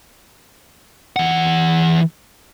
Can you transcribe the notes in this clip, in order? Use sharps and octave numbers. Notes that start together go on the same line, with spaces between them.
E3 F#5